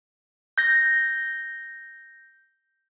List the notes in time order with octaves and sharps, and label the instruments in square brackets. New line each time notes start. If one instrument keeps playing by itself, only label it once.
[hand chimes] G6 A#6